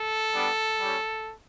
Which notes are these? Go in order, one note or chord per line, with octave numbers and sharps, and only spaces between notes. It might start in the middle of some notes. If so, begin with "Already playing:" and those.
Already playing: A4
G3 B3 D4
G3 C#4 G4